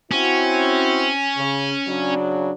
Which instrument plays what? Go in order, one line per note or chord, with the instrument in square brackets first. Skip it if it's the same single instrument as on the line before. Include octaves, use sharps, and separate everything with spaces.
[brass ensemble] C4 E4 F#4 [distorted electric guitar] C#4
[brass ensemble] C#3
C#3 F#3 D4